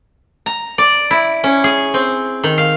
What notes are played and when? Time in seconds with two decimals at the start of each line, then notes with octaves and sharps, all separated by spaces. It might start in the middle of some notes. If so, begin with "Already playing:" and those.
0.46 A#5
0.78 D5
1.11 E4
1.44 C#4
1.64 G#4
1.94 C4
2.44 D#3
2.58 F5